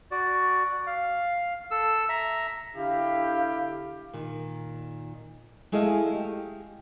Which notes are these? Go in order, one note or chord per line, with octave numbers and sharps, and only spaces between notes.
F#4 D5
F5
A4 E6
E5 A#5
D3 E4 G4 F5
A#2 D#3
G#3 A3 E4 G#4 D#5 F5
G4